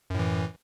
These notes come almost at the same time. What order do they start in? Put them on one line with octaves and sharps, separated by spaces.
F#2 A2 E3